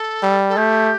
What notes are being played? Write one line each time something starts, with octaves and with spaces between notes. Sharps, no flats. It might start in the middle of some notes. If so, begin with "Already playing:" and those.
Already playing: A4
G3
A4
A3 G4